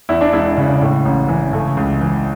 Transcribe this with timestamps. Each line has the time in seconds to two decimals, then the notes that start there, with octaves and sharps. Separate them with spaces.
0.09 E2 E4
0.21 D4
0.33 E1 E4
0.57 C#3
0.82 A2
1.05 A1
1.29 E3
1.53 C#3 A3
1.77 C#2
2.01 E3